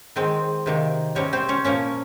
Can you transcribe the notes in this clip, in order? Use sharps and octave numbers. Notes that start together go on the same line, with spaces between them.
D#3 G#3 C4
C3 D#3 A#3
C3 G3 C4 C#4 C#5
C4 C5
C#4 C#5
A#2 F3 A#3 C#4 C#5